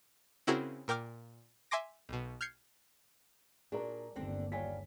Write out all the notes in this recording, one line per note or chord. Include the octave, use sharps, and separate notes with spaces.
C#3 C4 E4 F#4 G#4 A#4
A#2 A#4 G5 D6 F6
E5 G#5 C6 D6 A#6
B1 B2
F6 G6 G#6 C7 C#7
A#2 D4 F#4 G#4 A#4
G1 D#2 D3 C4 D4
G3 D4 F4 C#5 G#5 B6